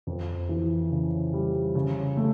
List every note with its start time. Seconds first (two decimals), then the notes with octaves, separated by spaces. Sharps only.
0.07 F2
0.49 E3
0.91 C#3
1.33 G3
1.75 C#3
2.17 A3